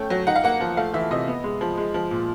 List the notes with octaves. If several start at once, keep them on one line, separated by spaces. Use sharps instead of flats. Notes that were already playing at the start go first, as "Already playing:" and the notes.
Already playing: A3 C#4 G5
F#3
D#4 F#5
F5
A#3 F#5
F3
A3 F5
E3 E5
C3 D#5
B3
G#3
F3
G#3
F3
A#2